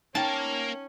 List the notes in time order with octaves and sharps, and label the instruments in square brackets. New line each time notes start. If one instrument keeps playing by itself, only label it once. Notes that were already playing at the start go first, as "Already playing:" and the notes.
[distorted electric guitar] A#3 A#4 [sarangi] C#4 [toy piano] D#4 G5 [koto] A5